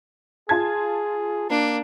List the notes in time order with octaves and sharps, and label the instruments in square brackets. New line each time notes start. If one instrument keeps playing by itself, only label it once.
[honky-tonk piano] F4 A5 G#6 [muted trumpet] G#4
[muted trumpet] A#3 [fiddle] D4